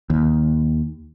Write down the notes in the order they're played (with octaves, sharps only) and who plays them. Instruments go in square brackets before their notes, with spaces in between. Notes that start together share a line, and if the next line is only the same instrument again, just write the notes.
[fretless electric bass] D#2